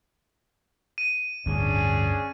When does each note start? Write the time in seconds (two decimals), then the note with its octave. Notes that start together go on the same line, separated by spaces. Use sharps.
0.98 D#7
1.46 G1 D2 A2 C#4 D4 G#4